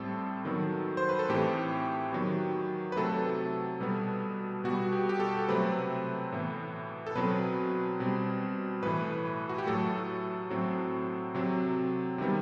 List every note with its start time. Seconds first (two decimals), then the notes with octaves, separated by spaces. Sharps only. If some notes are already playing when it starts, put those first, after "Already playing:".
Already playing: A2 G3 C4 A4
0.45 D#3 F#3 B3
0.97 C5
1.09 B4
1.19 A4
1.29 A2 E3 A3 C4 G4
2.13 D#3 F#3 B3
2.92 B4
2.97 C3 F#3 A3 A4
3.80 B2 G3 B3
4.64 B2 G3 B3 F#4
4.92 G4
5.09 G4
5.20 A4
5.48 C3 F#3 A3 C4 B4
6.32 A2 E3 B3
7.06 A4
7.15 B2 F#3 C4 B4
8.00 B2 G3 C4
8.83 A2 E3 A3 B4
9.49 F#4
9.58 G4
9.67 A2 F#3 A3 A4
10.50 A2 F#3 C4
11.35 C3 F#3 C4
12.18 C3 D#3 G3 B3